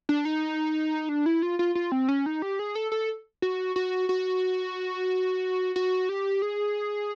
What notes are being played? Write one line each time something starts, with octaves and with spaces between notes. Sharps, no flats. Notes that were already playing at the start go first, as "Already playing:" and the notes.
D4
D#4
D4
E4
F4
F4
F4
C4
C#4
D#4
G4
G#4
A4
A4
F#4
F#4
F#4
F#4
G4
G#4